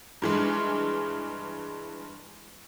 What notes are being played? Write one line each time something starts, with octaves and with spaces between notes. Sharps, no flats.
G2 E3 G#3